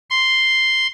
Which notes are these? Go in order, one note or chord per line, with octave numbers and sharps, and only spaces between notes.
C6